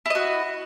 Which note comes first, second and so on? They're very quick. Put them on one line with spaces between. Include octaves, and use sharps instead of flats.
E4 D#5 F#4